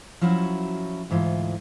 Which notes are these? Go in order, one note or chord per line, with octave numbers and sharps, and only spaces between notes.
F3 F#3 C#4 E4 F#4
D2 G#2 E3 F4